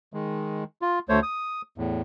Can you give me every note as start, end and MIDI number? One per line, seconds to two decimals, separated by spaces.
0.14 0.64 51
0.14 0.64 56
0.82 0.99 65
1.09 1.20 38
1.09 1.20 57
1.09 1.20 72
1.09 1.20 73
1.23 1.62 87
1.78 2.02 40
1.78 2.02 45